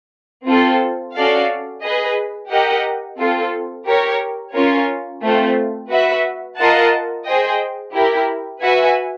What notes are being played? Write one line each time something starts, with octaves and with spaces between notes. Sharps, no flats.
C4 F4 A4
C#4 F#4 A4 D5 F5
G#4 B4 D#5
G4 A#4 D#5 F#5
C4 F4 A4
G4 A#4 C#5
C#4 F4 A#4 C#5
A3 C4 F4
F#4 B4 E5
F4 A#4 D#5 F#5 A5
G#4 C5 D#5 G5
E4 G4 A#4
F#4 B4 E5 G#5